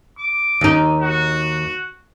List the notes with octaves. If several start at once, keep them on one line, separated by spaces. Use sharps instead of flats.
D6
D#2 D#4
F#4